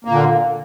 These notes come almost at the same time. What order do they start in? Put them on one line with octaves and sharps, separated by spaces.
A#3 A#2 D3